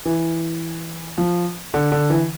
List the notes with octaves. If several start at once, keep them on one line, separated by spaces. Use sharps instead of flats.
E3
F3
D3
D3
E3